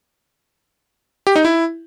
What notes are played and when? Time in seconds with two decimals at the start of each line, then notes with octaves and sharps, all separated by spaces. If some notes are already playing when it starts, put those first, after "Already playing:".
1.27 G4
1.36 D#4
1.45 E4